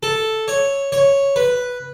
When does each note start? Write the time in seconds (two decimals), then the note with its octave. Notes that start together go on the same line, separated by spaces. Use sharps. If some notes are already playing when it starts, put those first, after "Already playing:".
0.03 A4
0.48 C#5
0.92 C#5
1.36 B4